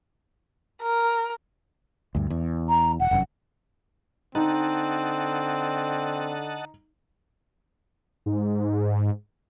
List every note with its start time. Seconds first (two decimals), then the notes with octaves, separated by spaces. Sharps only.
0.83 A#4
2.15 D2 G2
2.30 E2
2.69 A#5
3.00 E1 F#5
3.11 F1 F#2
4.35 D3 C4 D#4 D#5 F#5 A5
8.26 G#2